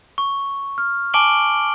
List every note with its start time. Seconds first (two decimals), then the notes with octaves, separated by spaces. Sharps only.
0.18 C#6
0.78 F6
1.14 G#5 A5 D6 D7 F#7 G7